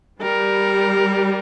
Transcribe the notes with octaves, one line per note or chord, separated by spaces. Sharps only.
G3 A#4